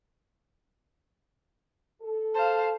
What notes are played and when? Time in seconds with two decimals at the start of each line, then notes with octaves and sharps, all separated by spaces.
2.02 A4
2.34 C5 F5 A5